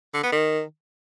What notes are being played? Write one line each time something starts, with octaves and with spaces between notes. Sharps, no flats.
D3
B3
D#3